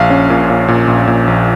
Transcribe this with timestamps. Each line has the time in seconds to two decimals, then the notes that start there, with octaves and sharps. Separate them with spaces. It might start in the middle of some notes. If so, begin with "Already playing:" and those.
Already playing: A#1 F5
0.10 C#4
0.30 A#2
0.50 A#2
0.68 A#2
0.88 A#1
1.07 A#2
1.27 A#1